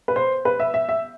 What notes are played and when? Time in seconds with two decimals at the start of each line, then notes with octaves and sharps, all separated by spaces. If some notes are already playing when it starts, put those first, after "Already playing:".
0.08 B4
0.16 C5
0.45 B4
0.60 E5
0.74 E5
0.89 E5